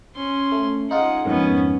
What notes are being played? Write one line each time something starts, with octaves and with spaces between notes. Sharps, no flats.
C#4 C6
A3
G#3 D#4 F4 F#5
F2 G#2 D#3 B3 C#4